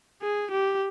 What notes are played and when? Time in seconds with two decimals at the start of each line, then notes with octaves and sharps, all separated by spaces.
0.22 G#4
0.51 G4